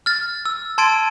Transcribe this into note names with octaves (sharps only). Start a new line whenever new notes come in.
F6 A6
E6
A5 C6 G#6 A6 D7 D#7